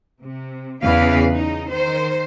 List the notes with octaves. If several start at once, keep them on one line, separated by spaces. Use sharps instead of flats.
C3
E2 C#3 E3 B4 F5
C#3 D#4
D#3 C5